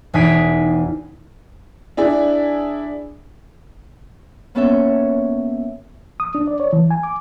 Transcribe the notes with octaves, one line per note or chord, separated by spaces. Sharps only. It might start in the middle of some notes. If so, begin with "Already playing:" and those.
E1 D#4 G#5 B6 C7 D7
D4 E4 G#4 D5
A#3 B3 C#4 A4 C#5 E5
D#6
D4
D5
C#5
E3
G#5
D6